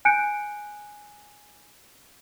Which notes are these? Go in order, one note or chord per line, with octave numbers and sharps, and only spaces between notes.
G#5 F#6 G6 C#7 D7